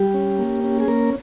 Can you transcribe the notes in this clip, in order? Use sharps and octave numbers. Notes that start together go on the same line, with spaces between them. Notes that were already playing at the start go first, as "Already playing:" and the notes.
Already playing: G3 G4
C#4
A#3
C#4
G#4
A#3 A#4